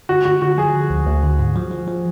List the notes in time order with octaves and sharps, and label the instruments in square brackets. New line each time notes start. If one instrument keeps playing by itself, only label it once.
[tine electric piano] D3 [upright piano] F#4
[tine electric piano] D3 [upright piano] F#4
[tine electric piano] D3 [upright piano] F#4
[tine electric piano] F3 [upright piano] G#4
[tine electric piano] D3
D2
D2
D3
G#2
F3
F3
F3